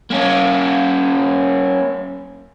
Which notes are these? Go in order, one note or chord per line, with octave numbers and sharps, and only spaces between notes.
A#3 C#4